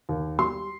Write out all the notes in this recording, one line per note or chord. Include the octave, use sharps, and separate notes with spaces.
D#2
G3 C6